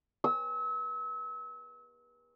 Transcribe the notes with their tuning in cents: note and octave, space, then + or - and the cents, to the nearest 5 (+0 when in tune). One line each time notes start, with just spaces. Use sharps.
E6 -35